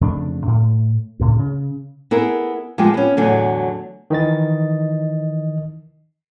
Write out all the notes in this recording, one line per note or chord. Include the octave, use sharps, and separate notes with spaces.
F2 C#3 A3 D4
A2
D2 A2 C#3
C#3
B3 E4 G#4 A#4
F3 G#3 B3 G4 G#4
B3 C#4
E2 A2 D3 F#3 G#4 G#5
D#3 E3 D#5 A6